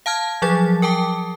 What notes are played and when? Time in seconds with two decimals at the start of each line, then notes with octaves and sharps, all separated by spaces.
0.06 F5 A5 F6 G#6
0.42 F3 F#3 G#4 A6
0.82 A#4 G5 A5 D6